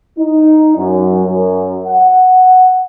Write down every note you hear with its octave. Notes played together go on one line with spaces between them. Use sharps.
D#4
F#2
F#2
F#5